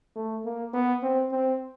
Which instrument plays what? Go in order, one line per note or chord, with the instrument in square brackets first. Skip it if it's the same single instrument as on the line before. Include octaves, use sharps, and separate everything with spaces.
[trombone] A3
A#3
B3
C4
C4